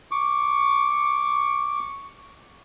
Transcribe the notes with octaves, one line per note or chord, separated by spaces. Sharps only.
C#6 D6